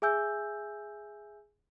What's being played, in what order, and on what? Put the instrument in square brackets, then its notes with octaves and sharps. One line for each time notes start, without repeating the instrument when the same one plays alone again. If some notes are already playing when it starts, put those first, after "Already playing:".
[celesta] G#4 E5 G#5 E6 G6